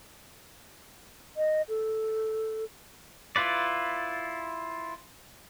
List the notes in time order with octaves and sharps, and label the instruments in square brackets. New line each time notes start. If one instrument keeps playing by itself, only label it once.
[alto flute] D#5
A4
[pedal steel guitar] E4 F4 B4 D5